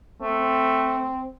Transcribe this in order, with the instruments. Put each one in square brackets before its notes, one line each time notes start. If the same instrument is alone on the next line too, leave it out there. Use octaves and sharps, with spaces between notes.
[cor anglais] A3 [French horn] C4